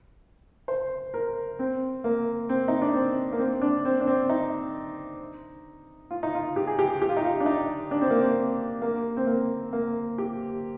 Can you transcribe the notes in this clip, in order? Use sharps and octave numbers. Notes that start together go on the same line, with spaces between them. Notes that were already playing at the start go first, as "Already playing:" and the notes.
C5
A#4
C4
A#3
C4
D#4
D4
C4
A#3
C4
D4
C4
D4
C4
D#4
F4
D#4
F4
G4
G#4
G4
G4
F4
D#4
F4
D4
D#4
D4
C4
A#3
C4
A#3
C4
A#3
A#3
G4